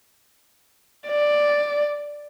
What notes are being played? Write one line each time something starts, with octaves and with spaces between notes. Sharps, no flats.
D5